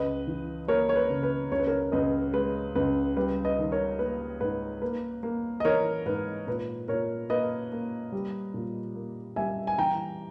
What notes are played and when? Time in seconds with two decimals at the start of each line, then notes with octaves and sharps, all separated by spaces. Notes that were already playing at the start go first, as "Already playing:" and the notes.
Already playing: C#2 B4 D#5
0.27 E3
0.68 A#3 A#4 C#5
0.89 C#5
0.96 B4
1.10 C#3
1.23 B4
1.52 C#2 C#5
1.59 B4
1.67 A#4 C#5
1.92 C#2 B4 D#5
2.33 G#3 B4
2.75 C#2 B4
3.17 G3 B4
3.44 B4 D#5
3.59 D#3
3.72 A#4 C#5
3.99 A#3 B4
4.40 G#2 B4
4.82 A#3 B4
5.23 A#3
5.60 D#5
5.65 E3 A#4 C#5
6.06 G#2 B4
6.47 A#2 B4
6.88 A#2 A#4 C#5
7.30 A#3 B4 D#5
7.72 A#3
8.12 G3
8.54 A#2
8.95 A#3
9.36 G3 E5 G#5
9.67 G#5
9.78 E3 G5 A#5